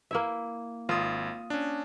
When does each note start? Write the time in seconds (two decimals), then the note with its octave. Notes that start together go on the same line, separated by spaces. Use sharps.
0.11 A#3 E4 E5
0.89 G#1 F4 D#6
1.50 C#4 D4